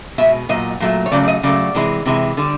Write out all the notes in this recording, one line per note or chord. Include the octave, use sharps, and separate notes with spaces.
B2 G#3 E5
A#2 F#3 D#5
A#2 F#3 A3
C#5
C#3 F#3 A3 D5
D5
D#5
C#3 F#3 A3 D5
C3 E3 G#3
C3 E3 G#3
D3 G3